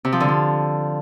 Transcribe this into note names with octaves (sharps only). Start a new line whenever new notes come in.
C3
F3
D3
F3